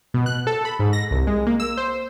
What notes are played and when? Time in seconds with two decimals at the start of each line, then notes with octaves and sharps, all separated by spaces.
0.14 B2
0.26 F#6
0.47 A4
0.65 B5
0.79 G#2
0.93 A#6
1.11 C2
1.27 G#3
1.47 A#3
1.60 E6
1.77 C5